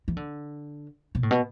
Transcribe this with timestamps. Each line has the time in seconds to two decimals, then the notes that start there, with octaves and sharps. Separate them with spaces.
0.08 E3
0.17 D3
1.15 B2
1.23 A2
1.31 B2